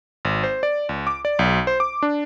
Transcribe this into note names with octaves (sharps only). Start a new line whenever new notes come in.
G#1
C5
D5
C#2
D6
D5
B1
C5
D6
D4